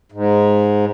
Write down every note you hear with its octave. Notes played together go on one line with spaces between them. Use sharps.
G#2